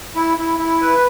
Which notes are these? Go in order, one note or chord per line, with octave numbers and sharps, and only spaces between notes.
E4
E4
E4
B4